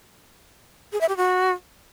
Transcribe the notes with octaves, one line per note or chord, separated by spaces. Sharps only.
G#4
E5
G4
F#4